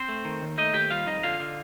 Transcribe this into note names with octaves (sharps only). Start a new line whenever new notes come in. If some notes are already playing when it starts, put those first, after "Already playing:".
Already playing: C4 C5
A3
D#3
D#2
A3 D#4 D#5
D#2 G4 G5
G3 F4 F5
F2 D#4 D#5
D3 F4 F5
D3